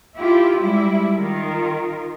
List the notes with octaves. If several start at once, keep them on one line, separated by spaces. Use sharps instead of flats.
E4 F4 G4
G3 G#3 E4
D#3 F4 A#4